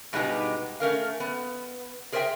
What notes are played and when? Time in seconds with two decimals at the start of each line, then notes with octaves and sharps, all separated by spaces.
0.13 G2 B2 G#3 B3 D#4 G4
0.80 A3 C#4 A#4 F5
1.20 B3
2.12 G#4 A#4 C5 C#5 E5 G5